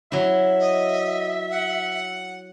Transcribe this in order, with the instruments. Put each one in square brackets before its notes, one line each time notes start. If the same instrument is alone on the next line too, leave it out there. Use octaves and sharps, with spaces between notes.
[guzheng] F#3 E4 [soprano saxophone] E5
[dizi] D#5
F#5